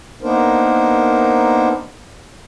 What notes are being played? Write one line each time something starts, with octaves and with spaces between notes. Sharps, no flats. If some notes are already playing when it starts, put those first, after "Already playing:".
A#3 B3 D4 D#4 A#4 C5